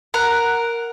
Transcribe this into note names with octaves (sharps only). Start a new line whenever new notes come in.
A#4 F#5